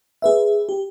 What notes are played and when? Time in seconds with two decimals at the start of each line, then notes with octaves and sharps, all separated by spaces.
0.22 G#4 B4 E5
0.69 G4